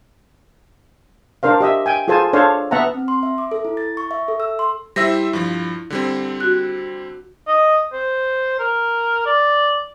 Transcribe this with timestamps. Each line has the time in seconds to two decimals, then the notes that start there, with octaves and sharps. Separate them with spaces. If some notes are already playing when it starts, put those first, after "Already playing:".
1.43 D4 A#4 C5 F5
1.60 G4 D#5 E5
1.86 G5 G#5
2.08 F4 G#4 A4 C5 G#5 A5
2.33 D4 A4 C5 C#5 F5
2.71 B3 E5 F#5 A5 A#5
2.94 C4
3.08 C6
3.23 E5
3.38 D6
3.51 A4
3.65 E4
3.77 A6
3.97 C#6
4.11 E5
4.28 A4
4.40 E6
4.59 C6
4.96 G3 E4 C5 E5 A#6
5.33 G2 F3
5.90 D3 G3 C4
6.40 F#4 F#6
7.47 D#5
7.93 C5
8.59 A#4
9.26 D5